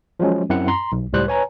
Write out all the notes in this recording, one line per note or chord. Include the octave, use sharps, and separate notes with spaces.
F3 F#3 G#3 C#4
F#2 C4 E4 F#5 C#7
A#5 C6
B1
C#2 A2 G3 C5 F#6
B4 C#5 G#5 A#5